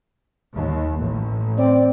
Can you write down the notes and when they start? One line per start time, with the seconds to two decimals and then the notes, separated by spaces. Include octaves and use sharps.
0.55 D#2
0.96 A1
1.58 C4 D5